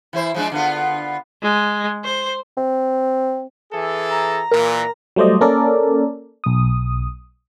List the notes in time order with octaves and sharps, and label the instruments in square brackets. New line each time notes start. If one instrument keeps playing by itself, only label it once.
[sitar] E3 E4 C5
F3 G#3 D4
D3 B3 F4
[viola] G#3
C5
[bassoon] C4
[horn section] E3 G#4 A4
[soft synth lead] A#5
[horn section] A#2 E3 [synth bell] A#4
[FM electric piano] F#3 G3 A3 C5 D5 D#5
A#3 C#4 A4 A#4 D5
B1 D#6